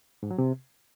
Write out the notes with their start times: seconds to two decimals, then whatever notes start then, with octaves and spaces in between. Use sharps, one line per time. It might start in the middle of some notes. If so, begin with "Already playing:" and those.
0.23 G#2
0.31 F#3
0.38 C3